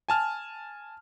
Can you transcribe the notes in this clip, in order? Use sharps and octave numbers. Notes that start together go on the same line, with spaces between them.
G#5 A5 F6